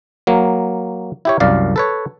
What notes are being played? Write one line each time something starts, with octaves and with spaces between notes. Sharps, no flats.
F#3 A#3
E4 G4 C#5
C2 F#2 D5 F5
A4 B4 C#5